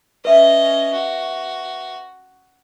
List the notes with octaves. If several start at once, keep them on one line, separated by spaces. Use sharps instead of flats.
C#4 B4 D#5 E5
F#4